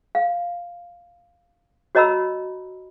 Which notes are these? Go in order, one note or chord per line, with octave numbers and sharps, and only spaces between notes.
F5
F#4 C#5 D#5 A#5 B5 E6